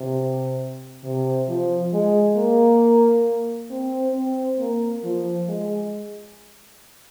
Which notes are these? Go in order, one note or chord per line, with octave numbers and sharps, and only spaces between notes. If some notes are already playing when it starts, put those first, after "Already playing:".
Already playing: C3
C3
F3
G#3
A#3
C4
C4
A#3
F3
G#3